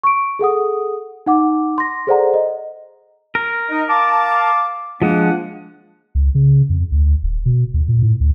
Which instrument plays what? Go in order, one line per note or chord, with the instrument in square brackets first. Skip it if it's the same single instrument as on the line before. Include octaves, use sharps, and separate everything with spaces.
[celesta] C#6 D7
G#4 A4 F#5 D#6
D#4 F#5 D6
C6 A#6
G#4 A4 C5 D5 F#5 A#5
D#5
[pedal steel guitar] A#4
[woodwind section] D#4 D#5
F5 A5 D6
[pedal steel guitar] F3 G#3 [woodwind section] A#3 D4 F#5
[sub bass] C#2
C#3
F2
D2
D#1
B2
D#2
A#2
A2
D2